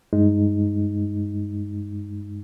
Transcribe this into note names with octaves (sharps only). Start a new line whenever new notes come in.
G2 G#3 D#4